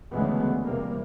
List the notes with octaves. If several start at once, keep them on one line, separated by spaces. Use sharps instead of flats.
D2 C#3 E3 G#3 B3
E2 C3 G3 A#3